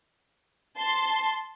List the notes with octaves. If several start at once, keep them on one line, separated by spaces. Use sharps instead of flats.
A5 C6